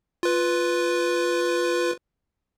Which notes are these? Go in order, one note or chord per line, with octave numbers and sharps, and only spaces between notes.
F4 B4